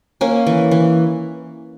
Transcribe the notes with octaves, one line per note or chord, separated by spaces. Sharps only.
A#3 C#4
E3
E3